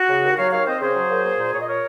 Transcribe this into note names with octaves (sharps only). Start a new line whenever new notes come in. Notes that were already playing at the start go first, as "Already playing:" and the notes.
Already playing: F#4
C#3
D#2
F#3 C#5 F5
D#2 C#5 F5
C4 C5 D#5
C#3 G#4 C5
F#3
A#3
A#3
A#2
A#2 C#5
D#5
A#4 C#5